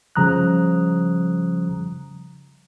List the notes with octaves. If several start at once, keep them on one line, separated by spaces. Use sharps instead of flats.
C#3 F3 G3 A#5 D#6 F#6